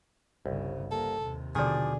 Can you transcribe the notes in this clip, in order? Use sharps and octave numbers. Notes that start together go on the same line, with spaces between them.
G1 C2 C#3
A#3 A4
D#2 C3
B2 D3 D#3 F3 G#4 D5